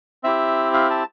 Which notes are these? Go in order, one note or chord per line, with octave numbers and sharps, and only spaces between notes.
C4 E4 G4 E5
F5
A5